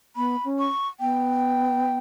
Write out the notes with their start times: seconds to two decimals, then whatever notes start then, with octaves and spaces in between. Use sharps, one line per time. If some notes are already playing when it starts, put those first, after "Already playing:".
0.16 B3 B5
0.44 C#4
0.59 C#6
1.00 B3 G5